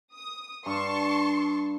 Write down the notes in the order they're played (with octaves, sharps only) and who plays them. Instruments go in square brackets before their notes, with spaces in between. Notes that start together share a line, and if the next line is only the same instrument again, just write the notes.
[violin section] D#6
[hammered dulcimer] G2 [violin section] A5 C6 C#6